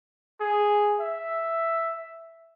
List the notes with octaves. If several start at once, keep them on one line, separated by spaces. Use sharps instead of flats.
G#4
E5